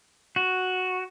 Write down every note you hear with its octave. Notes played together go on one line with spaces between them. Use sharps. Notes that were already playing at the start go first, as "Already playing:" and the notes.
F#4